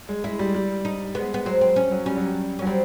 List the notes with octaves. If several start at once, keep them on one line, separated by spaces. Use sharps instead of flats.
G#3
G#3 E4
G3
G3
D#4
G#3 B3
B3
F#3 C4
C4
C#4
F#3
G3 C#4
F#3
G3
C#4
F#3
G3 C4